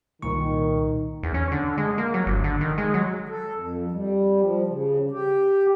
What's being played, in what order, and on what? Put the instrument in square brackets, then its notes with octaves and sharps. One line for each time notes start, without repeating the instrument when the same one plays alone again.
[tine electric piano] C2 A#2 C#6 [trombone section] D#3
[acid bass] E2
C#4
D3
G#3
A#3
F#3
G1
D3
D#3
G#3
F#3
[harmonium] A4
F2
G3
F3
C#3
G4